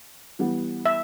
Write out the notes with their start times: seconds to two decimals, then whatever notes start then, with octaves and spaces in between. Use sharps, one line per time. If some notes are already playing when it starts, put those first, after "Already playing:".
0.39 E3 G3 B3
0.86 E5